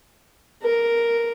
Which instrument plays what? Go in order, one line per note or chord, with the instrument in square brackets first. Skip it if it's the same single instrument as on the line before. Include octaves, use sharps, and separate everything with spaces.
[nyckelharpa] A#4